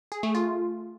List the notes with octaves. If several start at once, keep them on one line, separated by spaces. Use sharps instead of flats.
G#4
A3
F4